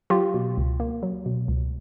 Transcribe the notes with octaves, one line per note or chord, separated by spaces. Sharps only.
F#3 F4 G4
B2
C#2
A#3
F#3
B2
C#2